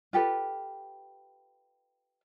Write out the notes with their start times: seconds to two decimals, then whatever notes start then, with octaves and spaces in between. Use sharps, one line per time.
0.13 F4 G4 A4 B4